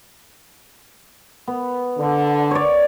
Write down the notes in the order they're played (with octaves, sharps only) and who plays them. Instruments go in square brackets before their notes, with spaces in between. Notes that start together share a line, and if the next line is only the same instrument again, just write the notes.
[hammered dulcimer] B3
[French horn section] D3
[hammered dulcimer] C#5 D5